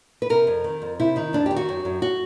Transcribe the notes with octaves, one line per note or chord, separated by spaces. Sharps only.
B4
C3 A#4
F2
D#3
F2
C3 E4
D#3 D#4
F2 D4
D#3 G4
F#4
F#2
F#2
F#4